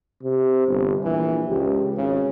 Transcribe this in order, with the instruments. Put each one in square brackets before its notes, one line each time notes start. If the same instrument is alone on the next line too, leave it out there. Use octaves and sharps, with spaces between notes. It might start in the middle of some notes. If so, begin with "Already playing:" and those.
[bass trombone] C3
G1
[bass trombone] A#1 [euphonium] E3
[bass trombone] C#2 [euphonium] G4
[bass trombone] G#1 [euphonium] C#3